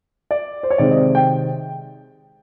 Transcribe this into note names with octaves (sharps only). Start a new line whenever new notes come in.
D5
C5
C#5
C3 D#3 G#3 C4 D5
D#5
G5